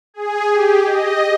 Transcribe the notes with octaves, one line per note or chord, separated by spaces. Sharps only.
G#4
G4
D#5